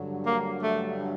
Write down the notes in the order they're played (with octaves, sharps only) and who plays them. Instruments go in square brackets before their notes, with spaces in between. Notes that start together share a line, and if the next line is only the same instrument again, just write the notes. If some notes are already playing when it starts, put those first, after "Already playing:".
Already playing: [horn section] G2 D3 F#3
A#3
A3